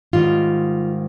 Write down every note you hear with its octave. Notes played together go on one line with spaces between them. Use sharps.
G#2 D#3 G3 F4